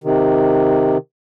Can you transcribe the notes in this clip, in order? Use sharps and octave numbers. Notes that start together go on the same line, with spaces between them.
C3 D#3